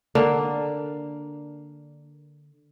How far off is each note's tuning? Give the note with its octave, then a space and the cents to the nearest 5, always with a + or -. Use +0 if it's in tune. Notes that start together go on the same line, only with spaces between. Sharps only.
D3 +5 A#3 +0 D4 +0